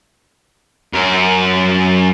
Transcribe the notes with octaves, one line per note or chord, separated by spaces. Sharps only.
F#2 A#4